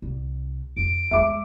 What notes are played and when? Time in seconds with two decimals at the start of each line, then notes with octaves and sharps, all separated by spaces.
0.02 C2
0.77 F2 F3 D7
1.11 E2 G#3 E5 D6